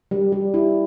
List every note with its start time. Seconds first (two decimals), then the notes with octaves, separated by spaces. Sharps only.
0.11 G3
0.32 G3
0.54 E4